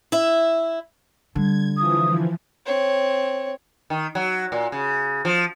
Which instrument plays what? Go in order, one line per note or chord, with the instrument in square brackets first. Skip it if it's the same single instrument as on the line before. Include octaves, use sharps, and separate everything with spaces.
[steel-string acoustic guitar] E4 E5
[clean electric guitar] D3 [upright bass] G3 [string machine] G#6
[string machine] E3 F3 [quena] D#6
[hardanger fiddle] C4 C#5
[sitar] D#3
F#3
A#2
C#3
F3